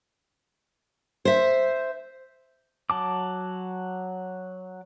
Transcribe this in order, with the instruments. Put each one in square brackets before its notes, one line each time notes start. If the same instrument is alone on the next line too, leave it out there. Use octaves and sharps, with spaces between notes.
[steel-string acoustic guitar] C5 E5
[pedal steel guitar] F#3 A5 D6